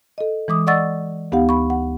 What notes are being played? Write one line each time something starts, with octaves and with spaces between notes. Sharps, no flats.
A4 D#5
E3 G#3 D6 D#6
D5 D#5 F#5 C#6 E6 A6
D2 B3 D#4 G4 F5 F#5
B5 C#6
F#5